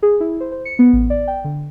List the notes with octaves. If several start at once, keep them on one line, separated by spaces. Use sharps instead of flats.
G#4
E4
C5
C5
C#7
B3
A1
D5
G5
D3